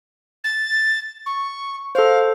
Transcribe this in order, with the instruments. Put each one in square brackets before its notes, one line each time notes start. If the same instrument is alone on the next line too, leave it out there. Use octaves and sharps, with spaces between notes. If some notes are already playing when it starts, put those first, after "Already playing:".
[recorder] A6
C#6
[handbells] A4 C5 [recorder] F5